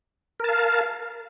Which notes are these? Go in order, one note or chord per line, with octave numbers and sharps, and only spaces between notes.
A#4 F5 A5